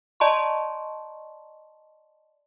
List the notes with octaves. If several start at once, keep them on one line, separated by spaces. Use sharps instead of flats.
D5 D#5 A5 A#5 C6 C#6